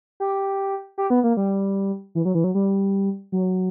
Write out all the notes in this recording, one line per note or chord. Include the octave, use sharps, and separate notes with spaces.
G4
G4
B3
A#3
G3
E3
F#3
E3
F#3
G3
F#3